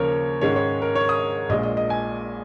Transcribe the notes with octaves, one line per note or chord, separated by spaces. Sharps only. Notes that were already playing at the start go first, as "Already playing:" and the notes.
Already playing: D#2 C#3 F3 A#3 C#4 A#4 C#5
G#2 D#3 G#3 C#4 C#5
C#5
A#4
C#5
D#6
A#1 A#2 G#3 D#5
D#5
D#5
G#5